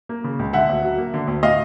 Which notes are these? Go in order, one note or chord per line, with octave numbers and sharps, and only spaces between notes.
A#3
C#3
C#2
D3 E5 F#5
D2
F#3
A#3
D3
D2
A2 D#5 F5